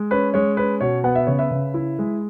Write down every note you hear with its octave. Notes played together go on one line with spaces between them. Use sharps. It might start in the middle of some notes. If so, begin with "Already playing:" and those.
Already playing: G#3
C#4 B4
G#3 C#5
C#4 B4
B2 C#5
B3 F#5
E5
C#3 C#5
B4 E5
C#3
E4
G#3